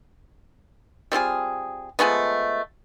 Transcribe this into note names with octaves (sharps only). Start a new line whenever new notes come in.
G3 C4 F4 G#4
F3 G#3 A3 B3